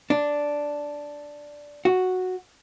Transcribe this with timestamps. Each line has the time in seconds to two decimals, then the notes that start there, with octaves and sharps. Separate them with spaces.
0.10 D4
1.85 F#4